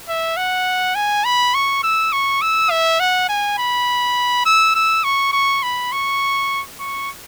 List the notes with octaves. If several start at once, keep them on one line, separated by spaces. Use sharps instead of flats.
E5
F#5
G#5
B5
C#6
E6
C#6
E6
E5
F#5
G#5
B5
E6
E6
C#6
C#6
B5
C#6
C#6